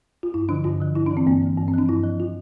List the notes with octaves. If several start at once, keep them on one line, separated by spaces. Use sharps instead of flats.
F4
G2 E4
D3 F3 D4
G2 F4
D3 F3
G2 E4
E3 D4
C4
G2 A#3
E3
G2
C4
F3 D4
G2 E4
F3
F4